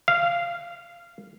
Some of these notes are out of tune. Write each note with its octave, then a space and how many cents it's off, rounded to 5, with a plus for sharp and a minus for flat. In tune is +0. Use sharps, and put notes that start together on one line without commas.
F5 -15